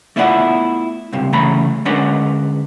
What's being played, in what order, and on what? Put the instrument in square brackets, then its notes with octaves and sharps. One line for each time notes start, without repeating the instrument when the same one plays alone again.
[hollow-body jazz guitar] A3 B3 E4 F4 D5 F#5
C#2 G2 C3
D2 C#3 E3 A3 A#5 B5
D3 G#3 C#4 D4 A#4 B4